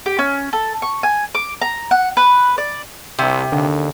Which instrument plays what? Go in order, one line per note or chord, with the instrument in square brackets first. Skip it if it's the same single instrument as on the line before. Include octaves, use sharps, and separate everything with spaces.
[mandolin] G4
C#4
A4
C#6
G#5
D6
A#5
F#5
B4
D5
[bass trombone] C2 [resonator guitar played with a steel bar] C3
[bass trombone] D#2 [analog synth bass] D3